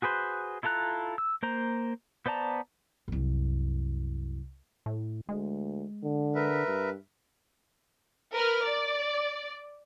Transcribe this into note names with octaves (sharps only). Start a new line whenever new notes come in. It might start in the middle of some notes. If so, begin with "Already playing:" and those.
F#4 G#4 B4 C5
E4 F4 A4 A#5 F#6
E6
A#3 C5 A#5
B3 C5 D5 A5 A#5
C2 F#2
A2
D2 G#3
D3
A#4 B4 E5
G2
A#4 B4 F6
D5